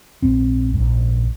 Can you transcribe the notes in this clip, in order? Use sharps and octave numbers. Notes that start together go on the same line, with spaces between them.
A#1 G#2 C4
A#1 G#2